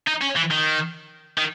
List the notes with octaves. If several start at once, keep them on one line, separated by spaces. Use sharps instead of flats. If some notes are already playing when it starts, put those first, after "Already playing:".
D#4
C#4
E3
D#3
D#3